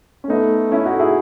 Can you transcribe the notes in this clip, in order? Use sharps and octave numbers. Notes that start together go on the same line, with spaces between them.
C#4
A3 B3 D#4
C#4 E4
D#4 F#4
E4 G#4